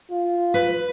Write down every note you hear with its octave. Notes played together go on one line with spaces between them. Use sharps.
F4
B4